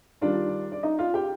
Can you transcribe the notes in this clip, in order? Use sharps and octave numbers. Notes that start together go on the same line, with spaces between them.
D#3 G3 D4 F4 D5
D5
D#4 D#5
F4 F5
G4 G5